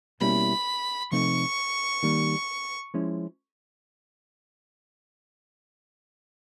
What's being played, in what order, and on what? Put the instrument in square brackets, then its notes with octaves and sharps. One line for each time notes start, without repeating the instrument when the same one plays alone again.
[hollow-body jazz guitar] B2 G3 A#3 C#4 E4 [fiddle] B5
[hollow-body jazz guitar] C3 F3 A3 C4 D#4 [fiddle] C#6
[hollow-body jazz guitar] D#3 G3 A#3
F3 G#3 C#4 E4